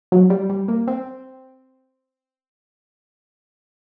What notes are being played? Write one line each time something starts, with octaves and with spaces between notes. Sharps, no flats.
F#3
G3
G3
A#3
C4